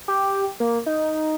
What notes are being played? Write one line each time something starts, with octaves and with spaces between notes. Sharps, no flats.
G4
A#3
D#4